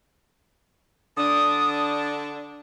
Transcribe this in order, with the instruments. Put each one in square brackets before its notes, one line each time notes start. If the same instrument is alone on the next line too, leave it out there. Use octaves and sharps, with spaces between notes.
[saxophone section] D3 D4 [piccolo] D#6